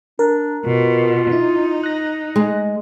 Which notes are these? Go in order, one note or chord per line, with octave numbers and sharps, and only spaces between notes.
D4 A#4
B2 F4
D#4 E4
F#6 A#6
G#3